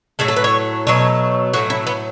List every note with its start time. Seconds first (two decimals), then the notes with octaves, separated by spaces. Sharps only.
0.19 A2 F#3 A3 G#4
0.28 A4
0.36 B4
0.44 C#5
0.87 B2 F#3 A3 C#5
1.53 A2 F#3 A3 F#4
1.70 E4
1.87 B3